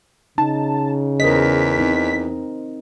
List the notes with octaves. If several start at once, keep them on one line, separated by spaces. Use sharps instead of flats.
C#3 D#4 A5
E2 A#4 C5 D#5 B6
C4 D#4